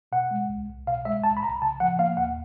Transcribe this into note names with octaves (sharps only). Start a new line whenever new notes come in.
B2 F#5
G#3
C2
C2
B2 F5
G#3 E5
C2 A5
B5
C2 A#5
C#3 A5
F3 F#5
A#3 F5
D#2 F#5